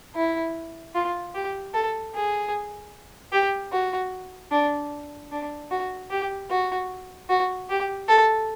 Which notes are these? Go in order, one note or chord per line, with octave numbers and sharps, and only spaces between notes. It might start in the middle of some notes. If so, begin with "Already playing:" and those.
E4
F4
G4
A4
G#4
G4
F#4
D4
D4
F#4
G4
F#4
F#4
G4
A4